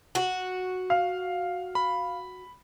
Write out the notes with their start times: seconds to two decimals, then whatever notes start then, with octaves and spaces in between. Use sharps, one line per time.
0.15 F#4
0.90 F5
1.75 B5